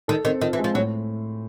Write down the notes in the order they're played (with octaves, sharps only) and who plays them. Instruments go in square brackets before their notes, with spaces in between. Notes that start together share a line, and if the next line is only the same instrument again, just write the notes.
[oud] D#3 [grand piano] A4
[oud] D#3 [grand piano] C4
[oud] D#3 [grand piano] F4
[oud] E3
[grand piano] G#3
[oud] F3
[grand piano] A2 [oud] F#3